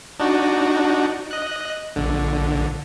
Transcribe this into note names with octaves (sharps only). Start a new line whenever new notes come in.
D4 D#4 F#4
D#5 F#6
A#1 D3